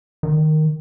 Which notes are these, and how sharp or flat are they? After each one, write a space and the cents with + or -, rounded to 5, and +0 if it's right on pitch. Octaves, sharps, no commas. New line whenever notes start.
D#3 -5